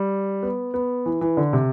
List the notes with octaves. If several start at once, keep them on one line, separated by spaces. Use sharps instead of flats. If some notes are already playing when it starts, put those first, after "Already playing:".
Already playing: G3
B3
B3
E3
E3
D3
C3